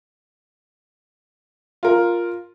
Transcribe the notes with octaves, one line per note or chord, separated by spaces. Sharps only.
F4 A#4